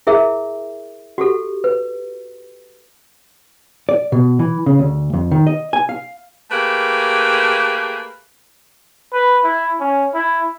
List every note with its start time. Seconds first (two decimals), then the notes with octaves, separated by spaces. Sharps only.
0.07 E4 G#4 A#4 E5
1.18 F#4 G4 A4
1.64 B4
3.89 D5
4.12 B2
4.39 E3
4.66 C#3
4.79 D2
5.14 F2
5.31 D#3
5.47 D#5
5.73 G#5
5.89 F5
6.51 A3 A#3 G4 G#4 B4
9.13 B4
9.44 E4
9.80 C#4
10.14 E4